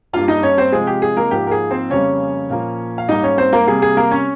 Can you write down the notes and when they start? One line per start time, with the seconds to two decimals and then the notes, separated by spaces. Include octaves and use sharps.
0.13 G2 G3 A#3 F4 F5
0.28 D#4 D#5
0.43 C#4 C#5
0.58 C4 C5
0.72 C3 F3 G#3 G#4
0.87 G4
1.02 G#4
1.17 A#3 A#4
1.31 G#2 F3 A#3 G4
1.47 A#4
1.51 G#4
1.71 C4 C5
1.90 F2 C#3 G3 A#3 C#4 C#5
2.49 A#2 F3 A#3
2.98 F5
3.09 G#2 G3 A#3 D#4 D#5
3.23 C#4 C#5
3.38 C4 C5
3.53 A#3 A#4
3.67 C3 G3 A#3 G#4
3.82 G#4
3.97 A#3 A#4
4.11 C#4 C#5